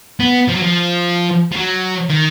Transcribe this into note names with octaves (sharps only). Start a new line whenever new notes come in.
B3
F3
F#3
F3
F3
F#3
D#3